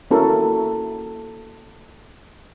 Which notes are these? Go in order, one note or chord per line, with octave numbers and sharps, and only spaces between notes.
A#3 C#4 E4 F#4 A4 A#4